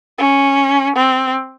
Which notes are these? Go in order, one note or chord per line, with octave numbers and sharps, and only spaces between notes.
C#4
C4